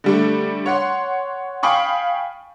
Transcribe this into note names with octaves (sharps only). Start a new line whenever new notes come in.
D3 G3 A3
C#5 F#5 C6
F5 G5 G#5 B5 C#6 D#6